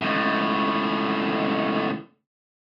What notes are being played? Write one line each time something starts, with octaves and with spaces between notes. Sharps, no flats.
C#2 A2